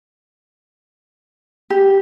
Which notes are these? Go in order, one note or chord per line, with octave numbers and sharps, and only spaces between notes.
G4